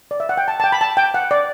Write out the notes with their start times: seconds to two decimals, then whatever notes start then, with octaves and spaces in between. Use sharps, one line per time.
0.11 D5
0.20 E5
0.29 F#5
0.37 G5
0.48 A5
0.60 A5
0.64 G5
0.72 B5
0.81 A5
0.97 G5
1.14 F#5
1.31 D5